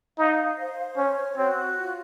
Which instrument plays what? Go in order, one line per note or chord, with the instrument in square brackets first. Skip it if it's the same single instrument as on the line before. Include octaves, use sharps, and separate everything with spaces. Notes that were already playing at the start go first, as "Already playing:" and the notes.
[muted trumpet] D#4 [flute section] F5
[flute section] C5
[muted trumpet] C#4 [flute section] C#5
[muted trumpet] C4 [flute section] F#4
[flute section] F4